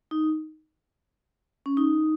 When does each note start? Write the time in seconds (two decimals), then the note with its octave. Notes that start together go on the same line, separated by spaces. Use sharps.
0.11 D#4
1.66 C#4
1.77 D#4